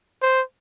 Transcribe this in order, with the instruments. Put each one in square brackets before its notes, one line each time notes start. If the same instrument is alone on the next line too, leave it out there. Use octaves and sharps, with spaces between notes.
[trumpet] C5